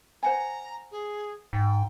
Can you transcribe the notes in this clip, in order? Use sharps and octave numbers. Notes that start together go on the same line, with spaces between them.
C5 F#5 G#5 A#5
G#4
G#2 G5